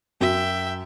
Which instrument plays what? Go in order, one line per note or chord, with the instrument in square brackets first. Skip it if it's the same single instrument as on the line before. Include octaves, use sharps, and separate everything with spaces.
[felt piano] F#2 [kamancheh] E5 G5